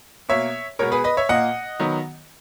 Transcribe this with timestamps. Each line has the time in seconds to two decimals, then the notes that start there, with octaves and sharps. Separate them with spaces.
0.29 B2 A#3 C#5 E5
0.79 B2 G#3 B3 A#4 C#5
0.92 G#4 B4
1.04 B4 D#5
1.17 C#5 E5
1.29 A#2 A#3 D#5 F#5
1.80 D#3 F#3 B3